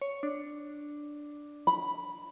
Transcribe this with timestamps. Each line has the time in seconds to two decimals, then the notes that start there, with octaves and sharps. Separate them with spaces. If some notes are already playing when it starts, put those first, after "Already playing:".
0.02 C#5
0.23 D4
1.67 B5